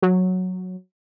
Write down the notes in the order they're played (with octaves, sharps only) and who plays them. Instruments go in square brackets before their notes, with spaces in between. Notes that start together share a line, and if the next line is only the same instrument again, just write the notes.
[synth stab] F#3